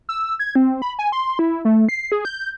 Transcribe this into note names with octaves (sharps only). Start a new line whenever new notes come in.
E6
G#6
C4
B5
G#5
C6
E4
A3
C7
G#4
G6